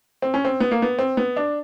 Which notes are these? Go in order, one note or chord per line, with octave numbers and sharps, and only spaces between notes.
C4
C#4
C4
B3
A#3
B3
C4
B3
D4